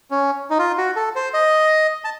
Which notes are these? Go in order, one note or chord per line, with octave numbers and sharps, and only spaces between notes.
C#4
D#4
F4
F#4
A4
C5
D#5
A5